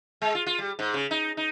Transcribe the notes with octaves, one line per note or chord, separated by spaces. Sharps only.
G#3
F4
F4
G3
G#2
C#3
D#4
D#4